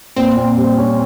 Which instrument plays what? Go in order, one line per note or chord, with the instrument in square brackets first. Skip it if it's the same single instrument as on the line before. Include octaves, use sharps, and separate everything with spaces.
[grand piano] A#2 [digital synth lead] C4
[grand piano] A#2
G3
C#4